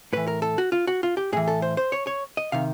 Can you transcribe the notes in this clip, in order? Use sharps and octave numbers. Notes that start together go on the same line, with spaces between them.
A2 E3 B4
A#4
A4
F#4
F4
F#4
F4
G4
A2 E3 G#4
A4
C5
C5
C#5
C#5
D#5
C3 D#3 F5